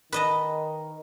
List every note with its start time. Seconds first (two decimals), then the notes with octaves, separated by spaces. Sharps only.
0.12 D#3 B4 D#5 A5